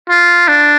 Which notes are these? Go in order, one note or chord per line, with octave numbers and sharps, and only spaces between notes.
F4
D4